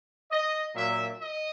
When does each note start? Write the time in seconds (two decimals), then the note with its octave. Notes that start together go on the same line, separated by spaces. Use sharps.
0.31 D#5
0.75 A#2 F#3 A#3 D4 E5
1.20 D#5